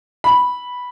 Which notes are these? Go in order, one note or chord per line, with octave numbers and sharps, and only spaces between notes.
B5